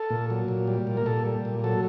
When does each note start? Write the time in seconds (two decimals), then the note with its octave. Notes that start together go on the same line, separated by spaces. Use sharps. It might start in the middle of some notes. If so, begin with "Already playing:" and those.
Already playing: A4
0.10 A#2
0.30 F#3
0.48 A#2
0.67 G3
0.87 A#2
0.97 A#4
1.06 A#2 A4
1.26 G3
1.45 A#2
1.64 F#3 A4